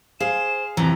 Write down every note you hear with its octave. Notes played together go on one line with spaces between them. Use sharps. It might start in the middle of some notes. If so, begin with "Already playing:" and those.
G#4 C5 F5 E7
F2 C3 E3 A#5